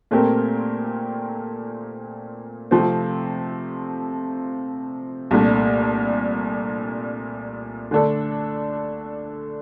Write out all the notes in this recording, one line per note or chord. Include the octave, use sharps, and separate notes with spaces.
A#2 A3 C4 G4 A#4
C3 F3 A3 C4
C2 A#2 A3 D4
D3 A3 D4 A4